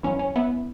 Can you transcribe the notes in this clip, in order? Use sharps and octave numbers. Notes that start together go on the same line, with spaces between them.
F#2 E3 C#4
C#4
B3 E4